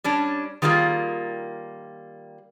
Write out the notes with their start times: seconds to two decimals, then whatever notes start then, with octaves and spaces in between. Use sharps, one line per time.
0.04 G3 C#4 D4
0.62 D#3 G3 A#3 F4 G#4